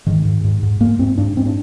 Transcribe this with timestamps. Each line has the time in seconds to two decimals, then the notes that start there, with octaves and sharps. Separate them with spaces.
0.07 G#2 D#3
0.25 G#2
0.44 G#2
0.63 G#2
0.80 G#2 A#3
0.99 G#2 C4
1.18 G#2 D4
1.36 G#2 C4
1.46 D4